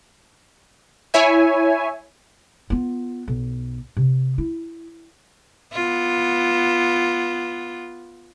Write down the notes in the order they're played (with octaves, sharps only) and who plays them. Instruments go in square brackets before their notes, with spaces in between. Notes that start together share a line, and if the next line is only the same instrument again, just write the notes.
[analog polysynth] E4 C#5 E5 G#5
[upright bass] B3 F4
B1
C3
E4
[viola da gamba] B3 F4